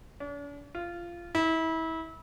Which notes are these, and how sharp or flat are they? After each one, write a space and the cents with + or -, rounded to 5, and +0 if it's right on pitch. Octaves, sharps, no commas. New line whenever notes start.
D4 -45
F4 -15
E4 -30